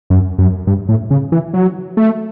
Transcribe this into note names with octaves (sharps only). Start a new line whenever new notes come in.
F#2
F#2
G2
A2
C#3
E3
F#3
A3